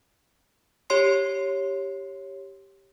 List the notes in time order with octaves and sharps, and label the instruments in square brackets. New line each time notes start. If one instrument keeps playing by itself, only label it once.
[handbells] G4 C#5 C6 C7